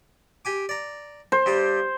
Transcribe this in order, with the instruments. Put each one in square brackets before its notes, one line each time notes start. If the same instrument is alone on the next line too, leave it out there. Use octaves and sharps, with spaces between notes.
[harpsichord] G4 G#5 D6
D5 A#5
[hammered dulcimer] C5
[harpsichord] G2 G3 D6